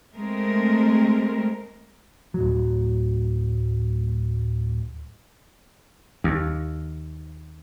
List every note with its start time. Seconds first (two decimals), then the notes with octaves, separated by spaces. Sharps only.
0.16 G#3 A3 C4 A#4
2.34 D1 F#3
6.24 D#2